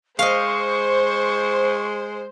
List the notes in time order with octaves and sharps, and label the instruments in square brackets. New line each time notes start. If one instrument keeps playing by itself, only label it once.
[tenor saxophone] G#3 [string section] C5 [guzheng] D#5 F5 [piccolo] C#6